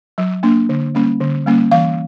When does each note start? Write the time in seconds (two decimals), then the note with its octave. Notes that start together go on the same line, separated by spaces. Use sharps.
0.18 F#3
0.43 A#3 D4
0.69 D3
0.95 G3 A#3 C#4
1.20 D3
1.47 G3 A#3 C#4
1.71 E3 F5